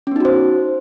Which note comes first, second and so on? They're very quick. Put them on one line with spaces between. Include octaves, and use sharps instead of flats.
C#4 B3 D#4 F#4 C5